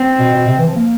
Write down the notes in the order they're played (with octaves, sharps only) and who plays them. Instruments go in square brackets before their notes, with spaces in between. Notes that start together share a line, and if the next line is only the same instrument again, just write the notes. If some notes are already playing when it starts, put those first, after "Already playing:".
Already playing: [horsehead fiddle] C4
[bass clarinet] B2
B2
C3
E3
F3
A#3